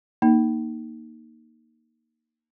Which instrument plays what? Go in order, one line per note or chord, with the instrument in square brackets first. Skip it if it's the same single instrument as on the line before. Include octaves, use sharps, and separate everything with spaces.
[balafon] A#3 D#4